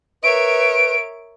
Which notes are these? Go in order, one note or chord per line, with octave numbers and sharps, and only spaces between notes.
A#4 B4 C#5 E5 D7